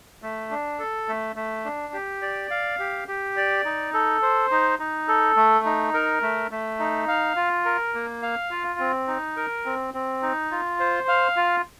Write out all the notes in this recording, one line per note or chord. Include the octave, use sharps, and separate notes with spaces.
A3
D4
A4
A3
A3
D4
G4
D5
F5
G4
G4
D5
D#4
A4
C5
D#4
D#4
A4
A3
D#4
A#4
A3
A3
D#4
F5
F4
A#4
A#3
F5
F4
C4
D#4
A#4
C4
C4
D#4
F4
C5
F5
F4